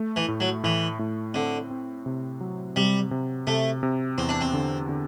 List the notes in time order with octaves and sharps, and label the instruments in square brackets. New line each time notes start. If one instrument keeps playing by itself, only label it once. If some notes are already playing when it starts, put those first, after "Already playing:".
Already playing: [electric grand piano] A3
[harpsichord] E3
[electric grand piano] A2
[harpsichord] F#3
[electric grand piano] A2 [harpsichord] E3
[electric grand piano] A2
[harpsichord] D3 [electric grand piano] C4
[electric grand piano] C4
C3
F#3
[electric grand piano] C3 [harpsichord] G3
[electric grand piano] C3
[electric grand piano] C3 [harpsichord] A3
[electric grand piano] C3
[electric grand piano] E2 [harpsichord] C4
[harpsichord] D4
C4
[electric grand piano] D3
D3